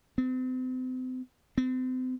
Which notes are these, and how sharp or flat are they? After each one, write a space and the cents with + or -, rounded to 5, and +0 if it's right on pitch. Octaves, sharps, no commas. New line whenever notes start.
C4 -40
C4 -40